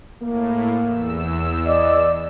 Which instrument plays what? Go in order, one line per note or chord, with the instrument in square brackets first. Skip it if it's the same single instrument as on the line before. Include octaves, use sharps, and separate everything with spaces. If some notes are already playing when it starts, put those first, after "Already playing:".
[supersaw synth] A2 [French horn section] A#3
[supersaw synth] E2 E6
[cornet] D5 [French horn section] D#5